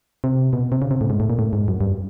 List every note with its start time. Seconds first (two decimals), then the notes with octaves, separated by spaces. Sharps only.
0.24 C3
0.53 B2
0.72 C3
0.82 C#3
0.91 C3
1.01 A2
1.10 G#2
1.20 A2
1.30 A#2
1.39 A2
1.53 G#2
1.68 F#2
1.81 G2